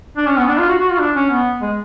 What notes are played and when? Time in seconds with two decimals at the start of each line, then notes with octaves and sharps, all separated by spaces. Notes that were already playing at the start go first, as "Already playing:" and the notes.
0.17 D4
0.27 C#4
0.38 B3
0.48 D4
0.58 F4
0.69 F#4
0.79 F#4
0.90 F4
0.99 D4
1.16 C#4
1.31 B3
1.62 G#3